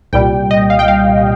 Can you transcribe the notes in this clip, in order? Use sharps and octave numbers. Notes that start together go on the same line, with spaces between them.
C2 A#2 G3 G5
D#5
F5
G5
F5